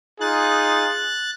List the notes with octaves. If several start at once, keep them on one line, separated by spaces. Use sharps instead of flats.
D#4 F4 G#4 F#6 A6